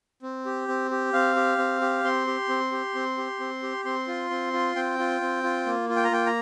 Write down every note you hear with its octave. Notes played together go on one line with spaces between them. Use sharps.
C4
G4
C4
G4
C4 F5
G4
C4
G4
C4 C6
G4
C4
G4
C4
G4
C4
G4
C4 C6
F4
C4
F4
C4 G5
F4
C4
F4
A#3
F4
G5
A#5
A#3 G5
A#5